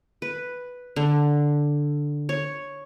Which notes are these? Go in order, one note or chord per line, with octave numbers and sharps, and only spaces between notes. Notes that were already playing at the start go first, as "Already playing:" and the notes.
B4
D3
C#5